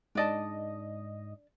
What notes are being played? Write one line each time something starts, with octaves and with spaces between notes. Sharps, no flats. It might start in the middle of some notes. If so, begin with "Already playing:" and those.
G#2 D4 D5 D#5 A5